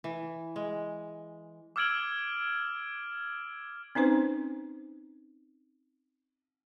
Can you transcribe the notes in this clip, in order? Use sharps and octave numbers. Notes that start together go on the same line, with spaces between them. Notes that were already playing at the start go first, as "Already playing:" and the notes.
E3
G#3
D6 E6 F6 G#6 D7 F#7
C4 C#4 D#4 B4 C5